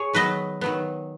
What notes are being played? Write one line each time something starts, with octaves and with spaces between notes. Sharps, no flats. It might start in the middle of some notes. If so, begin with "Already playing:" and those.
Already playing: G#4 C#5
D#3 F#3 B3 B4 D#5
D#3 F#3 B3